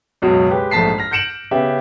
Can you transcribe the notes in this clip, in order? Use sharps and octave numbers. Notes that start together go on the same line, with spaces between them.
C#2 F#2 B2
G#3 G4 B4
A#1 G#2 A3 A5 B6 C7
F6 A#6
G6 A#6 C#7 D7 E7 F#7
C#3 B3 G4 E5